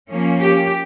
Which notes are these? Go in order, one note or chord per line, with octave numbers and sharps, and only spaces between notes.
F3 A#3 C#4
G4